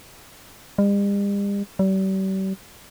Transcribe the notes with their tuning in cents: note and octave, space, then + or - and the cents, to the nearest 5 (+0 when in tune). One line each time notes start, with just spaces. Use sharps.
G3 +45
G3 -40